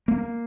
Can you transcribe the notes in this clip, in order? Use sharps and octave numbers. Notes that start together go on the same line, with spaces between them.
A#3